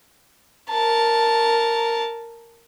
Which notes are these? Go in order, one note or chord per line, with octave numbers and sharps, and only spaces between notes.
A#4 A5